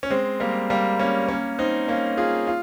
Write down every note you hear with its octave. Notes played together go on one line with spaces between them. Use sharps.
C#4
G#3 C4
G3 A#3
G3 A#3
A#3 C#4
A#3 C#4
C4 D#4
A#3 C#4
F4 G#4
F4